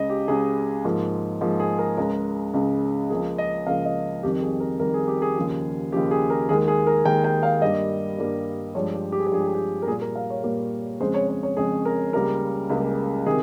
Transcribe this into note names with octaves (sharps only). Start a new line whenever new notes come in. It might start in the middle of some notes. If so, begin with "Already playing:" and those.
Already playing: C#2 C#3 G#3 D#5
G4
C#2 C#3 G#3 G#4
G#2 F3 A#3
G#2 F3 A#3
G#4
A#4
C#2 C#3 G#3 A#4
C#2 C#3 G#3
C#2 C#3 F3 A#3 G#4
D#5
C#2 C#3 F3 A#3 F5
D#5
F2 D#3 G3 G4
G#4
A#4
F2 D#3 G3 A#4
G#4
G4
G#4
D#2 C#3 F3
D#2 C#3 F3 G4
G#4
A#4
D#2 D#3 G#3 G#4
G#4
A#4
D#2 D#3 G#3 G5
G5
F5
G2 G3 A#3 D#5
G2 G3 A#3
G2 F3 G#3 C#5
G4
G4
G#4
G4
G2 F3 G#3 G#4
G4
G#4
G4
A#4
A#2 G3 A#3 G#4
A#4
F5
C#5
A#2 G3 A#3
F2 C#3 G#3 C5
C#5
C#5
C#5
F2 C#3 G#3 G#4
A#4
C#2 C#3 G3 A#3 A#4
C#2 C#3 G3 A#3
C3 D#3 G#4